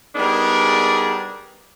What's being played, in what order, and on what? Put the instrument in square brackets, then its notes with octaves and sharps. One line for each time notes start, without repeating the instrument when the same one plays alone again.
[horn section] G3 B3 D4 D#4 G#4 A#4